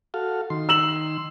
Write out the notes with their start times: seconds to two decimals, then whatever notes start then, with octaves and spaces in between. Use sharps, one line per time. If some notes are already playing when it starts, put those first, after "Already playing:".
0.14 F#4 A4 F5
0.50 D#3 C6
0.69 E6 E7 F#7